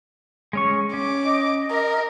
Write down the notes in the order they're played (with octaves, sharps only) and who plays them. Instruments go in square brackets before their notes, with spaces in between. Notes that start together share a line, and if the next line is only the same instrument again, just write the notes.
[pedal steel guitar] G#3 C#4 C#6
[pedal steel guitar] C#4 [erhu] D6
[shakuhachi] D#5
[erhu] A#4